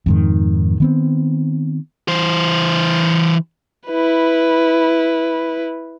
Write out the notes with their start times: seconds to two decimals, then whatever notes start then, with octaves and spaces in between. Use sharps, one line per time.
0.06 F2 G#2 D#3
0.80 D#3 B3 C4
2.08 E3 C5
3.87 E4 B4